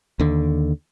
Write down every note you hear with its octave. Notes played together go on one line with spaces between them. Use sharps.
D#2 D3